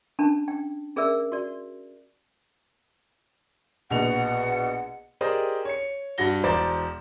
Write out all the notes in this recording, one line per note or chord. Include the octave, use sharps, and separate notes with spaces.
C#4 D4 A5
G5
C#4 G#4 A#4 D5 E5 E6
F#4 D5
A#1 B2 F#5 F7
G4 G#4 A#4 C5 D5 D#5
C#5 C#7
G2 F#4 F#5 A#6 G7
E1 C5 D5 A#5 D6 A6